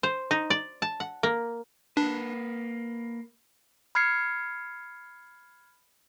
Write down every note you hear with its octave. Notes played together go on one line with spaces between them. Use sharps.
C5
D#4
D5
A5
F#5
A#3
A#3 D4 B4
B5 F6 G#6 C7 C#7